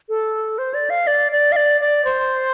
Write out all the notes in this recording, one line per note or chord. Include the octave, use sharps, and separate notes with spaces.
A4
C5
D5
F5
D5
D5
F5
D5
D5
C5